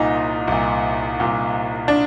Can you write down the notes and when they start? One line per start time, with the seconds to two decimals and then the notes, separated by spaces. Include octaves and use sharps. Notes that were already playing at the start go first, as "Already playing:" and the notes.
Already playing: C2 A#2 D#4
0.47 C2 A#2
1.20 C2 A#2
1.88 D4